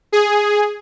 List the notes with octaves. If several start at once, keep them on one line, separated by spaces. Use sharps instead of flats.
G#4